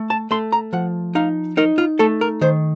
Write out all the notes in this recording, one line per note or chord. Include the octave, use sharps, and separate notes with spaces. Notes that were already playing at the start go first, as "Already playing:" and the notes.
Already playing: A3
A5
A3 C6
A#5
F3 F#5
D#4 F5
D#4 A#4
F4
A3 A4
A#4
D#3 C5